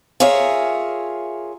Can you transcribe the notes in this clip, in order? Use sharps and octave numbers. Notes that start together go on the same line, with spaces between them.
F4 G#4 A#4 C#5 E5